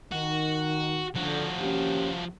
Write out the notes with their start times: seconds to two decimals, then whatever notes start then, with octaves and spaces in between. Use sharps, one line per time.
0.12 D#3 F#4
1.16 D3 F3 F#4
1.60 A#3 C#4 G4